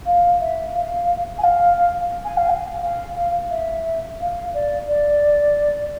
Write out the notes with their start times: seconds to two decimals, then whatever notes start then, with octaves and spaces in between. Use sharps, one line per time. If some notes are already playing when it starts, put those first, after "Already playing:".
0.06 F5
0.40 E5
0.75 F5
1.38 G#5
1.43 F5
2.25 G#5
2.37 F5
2.49 G#5
2.81 F5
3.50 E5
4.20 F5
4.54 D5
4.88 D5